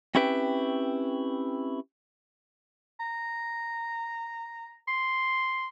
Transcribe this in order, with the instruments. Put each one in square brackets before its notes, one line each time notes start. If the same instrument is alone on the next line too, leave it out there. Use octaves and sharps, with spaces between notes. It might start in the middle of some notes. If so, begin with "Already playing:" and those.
[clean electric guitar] C4 C#4 E4 G4 B4 G5
[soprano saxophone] A#5
C6